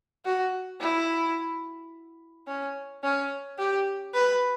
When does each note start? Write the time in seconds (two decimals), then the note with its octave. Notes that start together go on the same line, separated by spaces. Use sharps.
0.25 F#4
0.81 E4
2.47 C#4
3.03 C#4
3.58 G4
4.14 B4